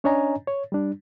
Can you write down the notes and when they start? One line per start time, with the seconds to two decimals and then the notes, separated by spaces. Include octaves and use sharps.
0.04 C#4 D4 C#5 D#5 G#5 A#5
0.48 C#5
0.72 G3 D4